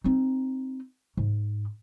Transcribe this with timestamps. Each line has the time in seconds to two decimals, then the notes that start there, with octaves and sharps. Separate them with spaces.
0.04 C4 D#4
1.17 G#2